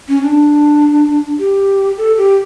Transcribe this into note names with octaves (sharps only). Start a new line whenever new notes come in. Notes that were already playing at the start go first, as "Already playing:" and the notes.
C#4
D4
G4
A4
G4